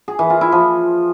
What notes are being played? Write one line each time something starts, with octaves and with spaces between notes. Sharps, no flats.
G#4
E3
F4
E4
F3